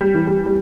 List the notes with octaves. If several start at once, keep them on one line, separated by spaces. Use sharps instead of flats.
G3
E3
G3
G3